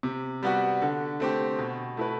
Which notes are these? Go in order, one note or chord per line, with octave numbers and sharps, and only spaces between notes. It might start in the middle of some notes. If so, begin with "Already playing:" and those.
C3
G3 B3 F#4
D3
A3 C4 G4
B2
A3 E4 B4